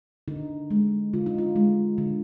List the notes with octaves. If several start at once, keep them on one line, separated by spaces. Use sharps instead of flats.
D3 D#4
G#3
D3 F4
D#4
F4
G#3
D3